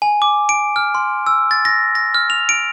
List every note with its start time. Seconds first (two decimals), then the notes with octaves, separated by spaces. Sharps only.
0.02 G#5
0.22 D6
0.49 D7
0.76 F6
0.95 C6
1.26 E6
1.51 A6
1.65 A#6
1.95 A#6
2.15 F6
2.30 F7
2.49 D7